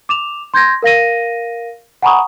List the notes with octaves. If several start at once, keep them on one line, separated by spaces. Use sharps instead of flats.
D6 E7 F7
C6 G6 G#6 A#6
A#4 F5 A#6 D#7
F#5 G#5 A#5 B5 C#6 D#6